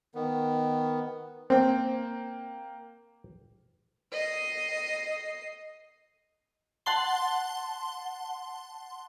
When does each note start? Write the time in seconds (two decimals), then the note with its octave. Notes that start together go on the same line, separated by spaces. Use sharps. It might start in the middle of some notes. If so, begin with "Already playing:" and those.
0.15 D#3 B3
1.50 A#3 C4 G5
4.12 D#5 C7
6.86 F#5 A5 C6 G7